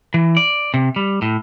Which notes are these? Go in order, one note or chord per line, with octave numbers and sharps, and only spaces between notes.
E3
D5
C3
G3
A2